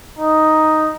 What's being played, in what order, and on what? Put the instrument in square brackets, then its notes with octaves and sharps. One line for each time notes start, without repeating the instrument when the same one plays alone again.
[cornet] D#4